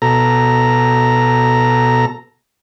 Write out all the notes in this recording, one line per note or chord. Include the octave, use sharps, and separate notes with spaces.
B2 A4 A#5